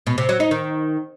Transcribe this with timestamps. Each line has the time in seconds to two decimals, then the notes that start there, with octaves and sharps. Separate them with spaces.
0.07 B2
0.18 C3
0.29 F#3
0.40 D#4
0.51 D#3